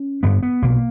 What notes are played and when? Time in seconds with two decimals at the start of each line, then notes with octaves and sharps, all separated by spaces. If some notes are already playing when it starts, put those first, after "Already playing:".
Already playing: C#4
0.23 G1 G2 D3 B3
0.43 B3
0.62 B1 B2 A#3